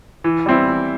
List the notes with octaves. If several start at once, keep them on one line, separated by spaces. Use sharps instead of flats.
E3
G3 C4 E4
E3